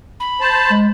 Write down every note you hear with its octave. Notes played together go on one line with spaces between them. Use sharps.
B5
C5 A5
G#3